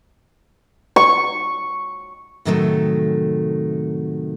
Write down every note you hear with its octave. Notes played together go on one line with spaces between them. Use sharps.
C#6
A2 C3 D#3 F#3 G3 A3